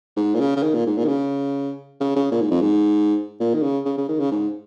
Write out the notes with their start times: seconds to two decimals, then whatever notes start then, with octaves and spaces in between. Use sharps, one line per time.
0.16 G#2
0.35 A#2
0.40 C#3
0.56 C#3
0.63 D#3
0.74 A#2
0.86 G#2
0.98 A#2
1.04 D#3
1.08 C#3
2.00 C#3
2.16 C#3
2.31 A#2
2.41 G#2
2.51 F2
2.61 G#2
3.40 A#2
3.54 D#3
3.63 C#3
3.85 C#3
3.97 C#3
4.08 D#3
4.20 C#3
4.32 G#2